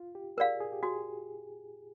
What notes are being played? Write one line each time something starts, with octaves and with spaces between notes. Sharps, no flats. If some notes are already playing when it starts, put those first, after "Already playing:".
Already playing: F4
G4
G#4 A#4 D5 F5
G#4
G4
F#4 G#4